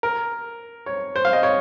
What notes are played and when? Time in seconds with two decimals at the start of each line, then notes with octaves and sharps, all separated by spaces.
0.03 A#4
0.86 C#5
1.16 C5
1.25 F5
1.33 D#5
1.43 C#5